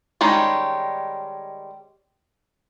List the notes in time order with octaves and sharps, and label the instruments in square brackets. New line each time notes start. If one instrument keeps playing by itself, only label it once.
[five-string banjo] D#3 G3 G#3 C#4